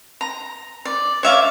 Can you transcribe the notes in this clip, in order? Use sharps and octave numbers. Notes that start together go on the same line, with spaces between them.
A#5
D5
C#5 E5 F5 D6